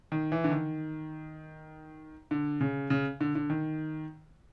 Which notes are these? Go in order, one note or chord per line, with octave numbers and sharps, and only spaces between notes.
D#3
E3
D3
D#3
D3
C#3
C#3
D3
D3
D#3